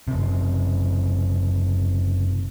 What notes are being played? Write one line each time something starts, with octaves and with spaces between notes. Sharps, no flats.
F#1 C3